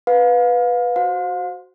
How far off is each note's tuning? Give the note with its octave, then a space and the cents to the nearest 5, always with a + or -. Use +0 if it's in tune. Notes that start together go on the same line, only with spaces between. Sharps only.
B4 +0 F5 +30
F#4 +0 C5 +0 F5 +40